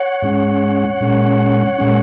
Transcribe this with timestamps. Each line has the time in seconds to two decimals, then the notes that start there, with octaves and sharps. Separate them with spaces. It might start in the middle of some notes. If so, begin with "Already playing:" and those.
Already playing: C#5 F#5
0.22 G#2 G#3 C#4
1.01 A#2 G#3 C#4
1.79 A#2 G#3 C#4